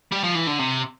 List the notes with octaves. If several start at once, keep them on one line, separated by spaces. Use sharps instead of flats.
G3
F3
E3
D3
C3